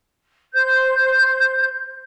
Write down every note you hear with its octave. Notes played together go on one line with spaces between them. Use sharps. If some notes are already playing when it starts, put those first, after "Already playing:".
C5 G6